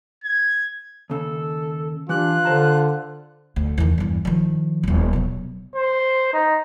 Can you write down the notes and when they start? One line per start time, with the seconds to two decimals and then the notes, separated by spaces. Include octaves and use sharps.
0.24 G#6
1.10 D#2 C#3 A4
2.09 E3 D4 F4 G4 F#6
2.45 D3 C5 A5 A#5
3.56 D2
3.78 E2 D#3
3.98 E2 G2
4.25 D#3 F3
4.83 D#1 G#1
5.13 B2 F#3
5.75 C5
6.33 D#4